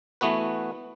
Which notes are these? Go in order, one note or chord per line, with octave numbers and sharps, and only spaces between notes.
E3 A3 B3 F#4 B4